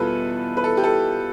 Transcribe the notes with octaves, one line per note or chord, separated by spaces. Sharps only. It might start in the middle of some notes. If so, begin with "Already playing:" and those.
Already playing: E2 B2 G3 E4 F4 A4 B4
B4
A4
G4
A4